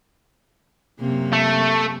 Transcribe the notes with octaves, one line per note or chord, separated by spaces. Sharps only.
F#2 C3 A#3
A3